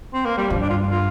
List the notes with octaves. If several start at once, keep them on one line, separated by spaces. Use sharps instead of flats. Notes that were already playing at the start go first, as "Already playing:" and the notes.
C4
A#3
G3
G2 F3
D4
F4
F4